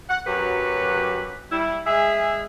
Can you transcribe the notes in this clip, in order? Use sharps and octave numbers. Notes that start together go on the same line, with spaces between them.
F#5
F#2 F#3 F#4 G4 B4
G3 E4
G#3 G#4 E5